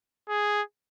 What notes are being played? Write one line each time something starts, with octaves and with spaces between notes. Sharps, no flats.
G#4